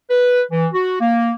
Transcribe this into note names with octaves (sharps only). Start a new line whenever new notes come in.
B4
E3
F#4
A#3